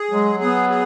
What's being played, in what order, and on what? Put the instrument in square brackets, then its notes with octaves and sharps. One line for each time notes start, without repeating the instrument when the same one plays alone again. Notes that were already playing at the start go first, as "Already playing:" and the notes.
Already playing: [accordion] G#4
[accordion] F#3 [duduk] G#3
[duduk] B3 [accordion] G#4
[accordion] G#4